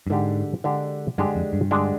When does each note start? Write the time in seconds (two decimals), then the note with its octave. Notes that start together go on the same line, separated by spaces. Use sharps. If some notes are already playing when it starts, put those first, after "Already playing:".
0.07 G2
0.10 G#2 D3 G#3 D4 G4
0.64 D3 G#3 D4 G4
1.18 G2 D3 G#3 D4 G4
1.35 F2
1.53 G2
1.71 D3 G#3 D4 G4